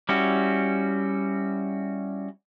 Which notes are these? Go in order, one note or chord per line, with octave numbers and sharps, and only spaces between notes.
G3 C#4 E4 F#4